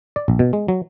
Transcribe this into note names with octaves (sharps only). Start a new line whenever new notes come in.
D5
A#1
B2
G#3
F#3